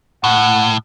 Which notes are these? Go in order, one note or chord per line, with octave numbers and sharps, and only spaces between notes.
A2 F#5